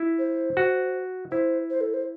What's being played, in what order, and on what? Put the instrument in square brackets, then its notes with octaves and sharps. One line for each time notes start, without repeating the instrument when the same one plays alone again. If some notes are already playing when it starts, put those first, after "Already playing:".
Already playing: [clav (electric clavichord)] E4
[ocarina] C5
[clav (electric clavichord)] F#4
[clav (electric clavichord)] E4 [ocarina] C5
[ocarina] C5
A4
C5